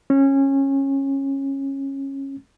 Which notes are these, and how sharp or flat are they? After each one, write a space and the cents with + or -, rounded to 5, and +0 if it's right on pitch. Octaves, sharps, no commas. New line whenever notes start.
C#4 -20